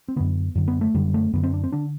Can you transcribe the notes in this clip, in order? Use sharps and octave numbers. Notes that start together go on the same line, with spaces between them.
C4
F#2 D3 B3
F#2 D3
B3
A3
F#2 D3 G3
A3
F#2 D3 B3
C4
D4
C4
D3 D4